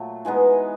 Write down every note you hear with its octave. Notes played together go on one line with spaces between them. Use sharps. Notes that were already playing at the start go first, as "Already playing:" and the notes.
Already playing: A#2 F#3 A3
E3 G#3 B3 D#4